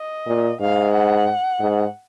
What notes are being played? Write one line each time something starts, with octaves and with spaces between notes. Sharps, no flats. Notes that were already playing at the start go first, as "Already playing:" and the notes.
Already playing: D#5
A#2
G#2 F5
F#5
G#2